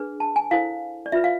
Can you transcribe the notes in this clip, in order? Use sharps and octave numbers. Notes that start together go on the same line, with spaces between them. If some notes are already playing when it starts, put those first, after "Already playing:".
Already playing: D4 G#4 B4
A5
G#5
E4 A4 C5 F5
D5
F4 B4 E5
F5